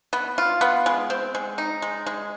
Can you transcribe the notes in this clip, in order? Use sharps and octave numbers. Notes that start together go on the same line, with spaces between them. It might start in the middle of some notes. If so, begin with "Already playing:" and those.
B3
F4
B3
G#3
C4
G#3
D#4
G#3
G#3